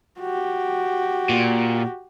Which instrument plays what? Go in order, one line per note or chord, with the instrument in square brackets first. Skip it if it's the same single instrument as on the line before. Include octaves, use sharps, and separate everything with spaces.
[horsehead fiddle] F#4 G4
[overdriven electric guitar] A#2